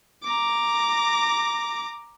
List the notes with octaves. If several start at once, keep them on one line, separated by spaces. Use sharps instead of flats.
A#5 D6